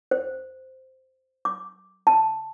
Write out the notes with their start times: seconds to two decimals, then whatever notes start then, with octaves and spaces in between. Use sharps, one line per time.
0.11 C5
1.45 D6
2.07 A5